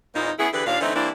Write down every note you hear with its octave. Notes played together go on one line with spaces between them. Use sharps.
E2 A#2 A#3 C4 D#4
B3 C#4 E4 G#4
D3 E3 G4 G#4 B4
D#2 A#2 D4 F5
D3 E3 A3 C4 D#4
E3 G3 A#3 C4 D4 E4